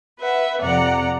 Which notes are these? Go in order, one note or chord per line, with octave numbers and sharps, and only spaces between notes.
B4 E5 F#5
F2 C3 D5 F#5 A#5